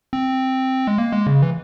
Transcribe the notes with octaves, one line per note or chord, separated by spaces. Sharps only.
C4
G#3
A#3
G#3
C#3
E3